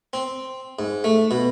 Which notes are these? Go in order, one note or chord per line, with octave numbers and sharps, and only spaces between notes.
C4
G#2
A3
B2